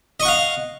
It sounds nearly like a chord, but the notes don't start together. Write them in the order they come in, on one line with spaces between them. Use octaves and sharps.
D#5 C#6 F#5 F5